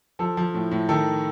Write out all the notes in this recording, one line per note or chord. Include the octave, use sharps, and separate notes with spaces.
F3 A4
F3
A2
A2
D#3 A4